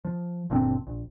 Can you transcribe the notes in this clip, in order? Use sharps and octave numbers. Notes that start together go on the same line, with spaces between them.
F3
F#1 A#2 D3 C4
A#1